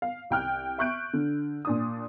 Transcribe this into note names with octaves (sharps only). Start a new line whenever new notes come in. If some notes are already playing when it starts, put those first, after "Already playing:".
F5
C2 G5 F6 F#6
E5 C#6 F#6 G6 D7
D3
A#2 D4 D#6